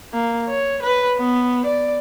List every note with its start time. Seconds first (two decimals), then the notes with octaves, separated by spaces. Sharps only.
0.13 A#3
0.49 C#5
0.82 B4
1.18 B3
1.66 D5